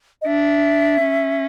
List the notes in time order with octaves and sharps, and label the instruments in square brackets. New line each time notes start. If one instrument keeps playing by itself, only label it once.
[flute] D#5
[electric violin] D4 [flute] E5
[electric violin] C#4